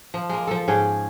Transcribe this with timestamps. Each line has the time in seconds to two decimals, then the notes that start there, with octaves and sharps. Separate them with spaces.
0.14 F3
0.29 G#3 A#3
0.47 F3 A4
0.68 G#2 C#4 G#4 G5